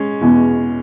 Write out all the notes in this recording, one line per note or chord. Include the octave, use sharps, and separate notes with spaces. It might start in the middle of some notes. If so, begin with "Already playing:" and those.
Already playing: G#3 C#4
E2 B2 B3